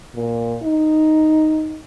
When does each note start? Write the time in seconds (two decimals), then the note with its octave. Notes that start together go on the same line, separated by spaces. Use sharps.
0.14 A#2
0.63 D#4